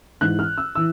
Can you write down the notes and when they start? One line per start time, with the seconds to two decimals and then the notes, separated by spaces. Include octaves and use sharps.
0.21 G#2 E3 F#6
0.39 F6
0.57 E6
0.75 E3 E6